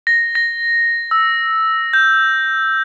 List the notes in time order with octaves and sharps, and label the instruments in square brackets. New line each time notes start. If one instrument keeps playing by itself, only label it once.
[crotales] A#6
A#6
E6
G6